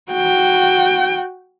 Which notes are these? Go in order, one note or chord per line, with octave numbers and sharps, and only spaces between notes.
F#4 G5